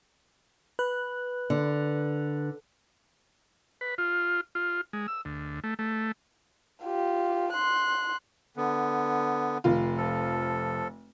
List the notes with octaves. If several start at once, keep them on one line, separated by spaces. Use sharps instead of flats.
B4 F#6
D3
B4
F4
F4
G#3
E6
D2
A3
A3
F4 G4
C6 F#6
D3 B3
F1 F4
F3 A4